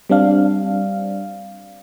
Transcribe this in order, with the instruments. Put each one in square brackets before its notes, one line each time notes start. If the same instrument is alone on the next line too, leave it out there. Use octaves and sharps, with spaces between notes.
[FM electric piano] G3 C4 D4 F5